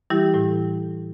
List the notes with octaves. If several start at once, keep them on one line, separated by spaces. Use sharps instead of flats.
E3 G3 E4 G4
A2